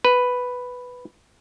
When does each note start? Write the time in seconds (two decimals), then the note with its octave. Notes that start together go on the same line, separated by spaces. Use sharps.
0.05 B4